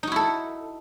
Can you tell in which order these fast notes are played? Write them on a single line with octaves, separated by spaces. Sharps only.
D#4 F#4 E4 A4